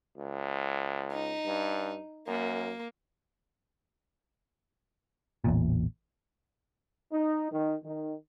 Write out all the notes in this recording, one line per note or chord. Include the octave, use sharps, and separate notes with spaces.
C#2
D#4
G2
F#2 A#3
A1 E2 A#2
D#4
D#3
D#3